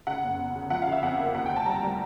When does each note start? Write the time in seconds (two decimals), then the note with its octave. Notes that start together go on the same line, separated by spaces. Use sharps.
0.07 C#3 F#5
0.24 F#1
0.40 E2
0.55 C#3
0.70 F3 F#5
0.82 F5
0.87 C#3 E5
1.03 F2 F#5
1.18 A#3
1.34 D#2 F#5
1.46 G5
1.50 F1
1.56 A5
1.66 G3 A#5
1.83 G3